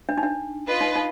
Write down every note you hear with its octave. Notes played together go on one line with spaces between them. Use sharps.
D4
D#4
D4
F4 B4 D#5
D#4
D#4